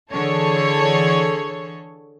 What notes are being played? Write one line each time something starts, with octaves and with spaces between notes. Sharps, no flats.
D3 E3 G#4 A4 C#5